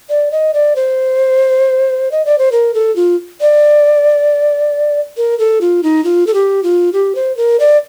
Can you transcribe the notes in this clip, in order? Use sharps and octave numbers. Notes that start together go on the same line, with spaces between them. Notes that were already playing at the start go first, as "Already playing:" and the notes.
D5
D#5
D5
C5
D#5
D5
C5
A#4
A4
F4
D5
A#4
A4
F4
D#4
F4
A4
G4
F4
G4
C5
A#4
D5